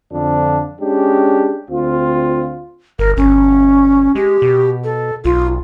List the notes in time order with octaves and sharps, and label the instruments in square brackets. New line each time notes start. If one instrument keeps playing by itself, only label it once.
[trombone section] F2 D3 F3 D4
G#3 C#4 D4 G4
D2 C4 F4
[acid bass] G1 [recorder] A#4
[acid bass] G1 [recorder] C#4
[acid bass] G#3 [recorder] G4
[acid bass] B2
[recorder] A4
[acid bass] B1 [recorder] F4